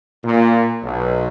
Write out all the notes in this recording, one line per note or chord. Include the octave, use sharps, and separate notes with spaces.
A#2
B1